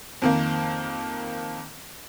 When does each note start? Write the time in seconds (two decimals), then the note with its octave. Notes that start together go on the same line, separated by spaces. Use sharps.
0.22 F2 D#3 A#3